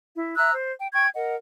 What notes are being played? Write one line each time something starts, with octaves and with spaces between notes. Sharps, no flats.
E4
E5 A#5 E6 F#6
C5
G5
G5 C#6 G#6
A#4 D#5 F#5